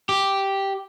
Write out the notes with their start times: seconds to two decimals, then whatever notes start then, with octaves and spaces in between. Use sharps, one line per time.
0.09 G4